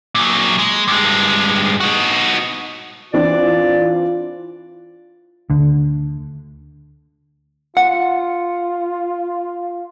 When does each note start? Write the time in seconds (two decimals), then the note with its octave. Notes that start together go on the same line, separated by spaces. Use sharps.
0.15 A#2 F#3
0.59 G#3
0.88 G2 G#3
1.81 D#4 F#4
3.14 E3 C4 D4 F4 D5
5.50 D2 D3
7.77 F4 F#5